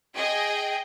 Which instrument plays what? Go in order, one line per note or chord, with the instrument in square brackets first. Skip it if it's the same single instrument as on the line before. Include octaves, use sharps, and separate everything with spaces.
[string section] G#4 D#5 G5